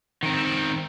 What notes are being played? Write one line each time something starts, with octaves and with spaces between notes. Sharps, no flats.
D#3 C4